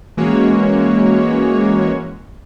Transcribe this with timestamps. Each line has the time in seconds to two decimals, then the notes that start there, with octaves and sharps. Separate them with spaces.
0.17 E3 G#3 A#3 C#4 F#4 C#5